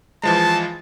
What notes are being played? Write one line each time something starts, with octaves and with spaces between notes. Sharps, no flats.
E3 F3 G#3 A5